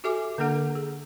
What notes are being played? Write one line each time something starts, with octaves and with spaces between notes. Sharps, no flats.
F#4 G4 A4 E5 G#5 D6
D3 A#3 D4 A4 F#5 A#5
G#4